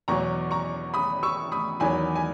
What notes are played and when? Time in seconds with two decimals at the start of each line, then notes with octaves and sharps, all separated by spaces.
0.08 E2 B2 F#3 A#5 C#6
0.51 A#5 C#6
0.94 B5 D#6
1.23 C#6 E6
1.52 B5 D#6
1.80 E2 D#3 F#3 G#5 B5
2.16 G#5